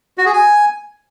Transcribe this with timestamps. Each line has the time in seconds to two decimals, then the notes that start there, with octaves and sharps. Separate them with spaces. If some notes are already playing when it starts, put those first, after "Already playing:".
0.18 F#4
0.26 G#4
0.34 G#5